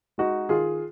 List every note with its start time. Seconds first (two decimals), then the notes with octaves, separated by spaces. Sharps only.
0.18 G#3 D#4 F#4
0.49 D#3 F4 G#4